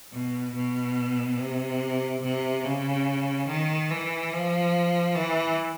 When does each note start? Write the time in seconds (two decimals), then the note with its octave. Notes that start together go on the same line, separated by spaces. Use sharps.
0.13 B2
0.55 B2
1.38 C3
2.23 C3
2.64 C#3
3.48 D#3
3.90 E3
4.32 F3
5.15 E3